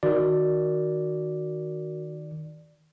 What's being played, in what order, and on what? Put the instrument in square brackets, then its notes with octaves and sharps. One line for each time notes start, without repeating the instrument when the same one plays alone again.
[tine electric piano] D#3 D5 [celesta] F#4 A#4